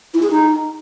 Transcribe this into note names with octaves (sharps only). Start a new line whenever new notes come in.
E4
G#4
D#4